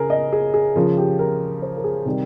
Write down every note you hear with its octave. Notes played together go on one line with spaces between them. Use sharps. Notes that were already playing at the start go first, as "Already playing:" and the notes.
Already playing: C#3 G#4 A#4
D#5
G#4
G#4
C#3 F3 A#4
G4
A#4
C5
A#4
G#4
C3 D#3 G3 G4